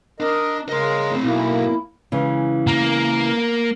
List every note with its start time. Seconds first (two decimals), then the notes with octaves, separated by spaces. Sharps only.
0.20 D4 A#4 D#5
0.69 C#3 A#4 D#5 C6
1.11 A3 C4
1.23 B1 A#3 E4
2.12 C#3 E3 G#3
2.67 A#3